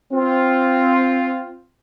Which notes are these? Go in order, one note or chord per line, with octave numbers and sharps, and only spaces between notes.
C4 F4